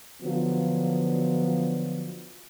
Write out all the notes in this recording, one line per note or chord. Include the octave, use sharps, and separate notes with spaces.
D3 F3 F#3 B3 F4